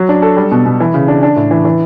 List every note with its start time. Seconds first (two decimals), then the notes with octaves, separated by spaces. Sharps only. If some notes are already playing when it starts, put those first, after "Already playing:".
Already playing: F#3
0.09 D4
0.22 A4
0.37 G3
0.52 B2
0.66 B2
0.80 E3
0.94 C#3
1.08 D4
1.23 D4
1.36 A2
1.51 E3
1.65 E3